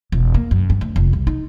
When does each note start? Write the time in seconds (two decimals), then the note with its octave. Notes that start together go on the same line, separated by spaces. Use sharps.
0.12 E1
0.34 A#3
0.51 F#2
0.70 G2
0.81 D2
0.96 F1
1.13 C2
1.27 D#4